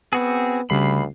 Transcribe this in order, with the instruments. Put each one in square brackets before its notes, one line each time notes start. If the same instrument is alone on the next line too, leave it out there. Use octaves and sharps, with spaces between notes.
[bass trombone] B3 [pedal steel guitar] C4 F#4 G#4
[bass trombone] D2 [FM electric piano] C#3 G3 C7 [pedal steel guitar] B5